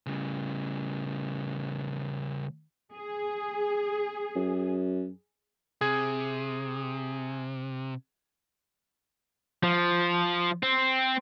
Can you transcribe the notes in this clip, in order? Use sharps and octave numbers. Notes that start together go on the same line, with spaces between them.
C#3 G3
G#4
F#2
C3 G#4 G#6
F3
C4